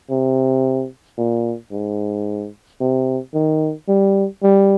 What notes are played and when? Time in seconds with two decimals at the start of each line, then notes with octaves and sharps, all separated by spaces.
0.10 C3
1.18 A#2
1.72 G#2
2.81 C3
3.34 D#3
3.88 G3
4.42 G3